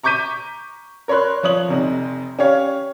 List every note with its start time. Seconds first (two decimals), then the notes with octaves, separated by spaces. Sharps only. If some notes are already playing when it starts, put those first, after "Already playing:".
0.03 A#5 C#6 D6 G6 B6 D#7
1.08 A#4 C#5 B5 C6 F#6
1.43 F3 C#5 D#6 F#7
1.68 F1 C3 D#4
2.39 C#4 G4 C#5 F5